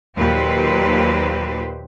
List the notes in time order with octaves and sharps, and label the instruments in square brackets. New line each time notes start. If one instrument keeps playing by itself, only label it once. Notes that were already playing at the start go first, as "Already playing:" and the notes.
[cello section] D#2 A#2 F#3 G4 B4 C5